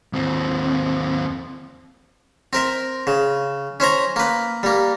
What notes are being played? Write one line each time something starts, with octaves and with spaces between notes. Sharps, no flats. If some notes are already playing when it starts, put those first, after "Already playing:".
D#2 C4
C4 A#4 E5
C#3
C#4 C5 E5 A#5
A#3 B4
G3 A#3